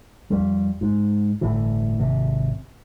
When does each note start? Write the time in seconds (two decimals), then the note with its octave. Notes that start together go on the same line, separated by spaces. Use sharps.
0.30 F2 G3
0.81 G#2
1.41 G1 A2 E3
1.99 G#1 C3